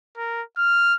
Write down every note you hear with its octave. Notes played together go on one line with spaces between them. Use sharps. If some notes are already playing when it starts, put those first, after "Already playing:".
A#4
F6